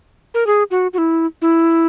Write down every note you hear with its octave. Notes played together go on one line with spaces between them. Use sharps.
A#4
G#4
F#4
F#4
E4
E4